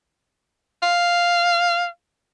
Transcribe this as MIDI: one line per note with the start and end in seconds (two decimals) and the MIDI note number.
0.82 1.87 77